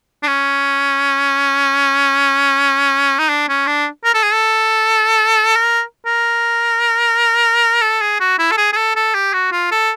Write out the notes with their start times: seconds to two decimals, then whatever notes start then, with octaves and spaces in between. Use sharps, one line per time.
0.23 D4
0.27 C#4
3.18 D#4
3.29 D4
3.48 C#4
3.67 D4
4.04 A#4
4.14 A4
4.23 G#4
4.32 A4
5.55 A#4
6.06 A#4
7.82 A4
8.01 G#4
8.20 F#4
8.39 E4
8.51 A4
8.57 G#4
8.72 G#4
8.76 A4
8.96 A4
9.14 G4
9.33 F#4
9.52 F4
9.71 A4